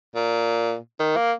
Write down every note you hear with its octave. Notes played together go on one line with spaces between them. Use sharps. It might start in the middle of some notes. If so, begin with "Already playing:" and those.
A#2
D#3
A#3